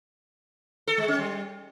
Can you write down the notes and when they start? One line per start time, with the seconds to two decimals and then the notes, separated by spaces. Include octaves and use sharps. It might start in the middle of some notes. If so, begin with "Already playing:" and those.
0.87 A4
0.98 G#3
1.08 C#4
1.18 G3